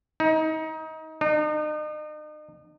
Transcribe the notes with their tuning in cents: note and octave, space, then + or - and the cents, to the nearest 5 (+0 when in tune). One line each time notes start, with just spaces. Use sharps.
D#4 +25
D#4 -40